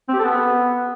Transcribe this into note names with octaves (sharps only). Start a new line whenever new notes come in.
C4
G4
A4
B3